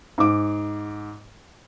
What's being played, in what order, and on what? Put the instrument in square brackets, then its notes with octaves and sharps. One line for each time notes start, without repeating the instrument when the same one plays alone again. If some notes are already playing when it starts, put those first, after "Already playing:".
[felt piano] G#2 D6